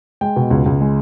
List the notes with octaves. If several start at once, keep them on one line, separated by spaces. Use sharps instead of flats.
G#3 G5
B2
C#2
C#2
G#3